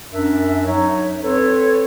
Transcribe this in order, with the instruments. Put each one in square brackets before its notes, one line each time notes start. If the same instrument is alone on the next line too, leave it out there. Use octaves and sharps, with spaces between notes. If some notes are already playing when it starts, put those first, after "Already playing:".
[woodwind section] F#2 D4 A#4 E5
F#3 D#4 C#5
C4 A4 B4 C#5